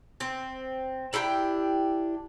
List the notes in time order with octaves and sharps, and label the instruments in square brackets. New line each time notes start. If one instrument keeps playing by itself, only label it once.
[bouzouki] C4
D4 E4 G4 G5